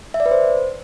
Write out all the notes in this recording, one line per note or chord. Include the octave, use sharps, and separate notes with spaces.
E5
D5
B4
C5